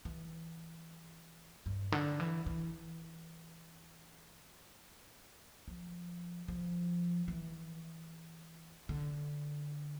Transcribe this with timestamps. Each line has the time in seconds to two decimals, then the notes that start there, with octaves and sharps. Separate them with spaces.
0.05 E3
1.66 G2
1.92 D3
2.20 E3
2.46 E3
5.68 F3
6.48 F3
7.28 E3
8.89 D3